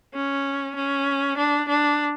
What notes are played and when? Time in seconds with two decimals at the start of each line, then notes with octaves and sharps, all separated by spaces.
0.14 C#4
0.76 C#4
1.38 D4
1.69 D4